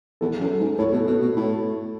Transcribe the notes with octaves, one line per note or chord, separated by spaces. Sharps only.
E2 A4
F#2
G#2
A2 A4 C#5
B2
B2
B2
A2